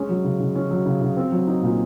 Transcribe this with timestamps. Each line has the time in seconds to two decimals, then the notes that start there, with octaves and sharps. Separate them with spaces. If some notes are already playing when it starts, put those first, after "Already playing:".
Already playing: G#3 C#4
0.09 F#3
0.24 C#3
0.40 C#3
0.55 C#4
0.71 F#3
0.85 C#3
1.01 C#3
1.17 C4
1.32 F#3
1.47 D#4
1.62 A#2